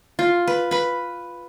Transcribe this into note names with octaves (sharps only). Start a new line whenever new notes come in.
F4
B4
B4 B5